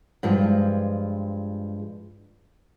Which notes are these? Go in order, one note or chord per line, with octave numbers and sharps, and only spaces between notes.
G2 F3 G#3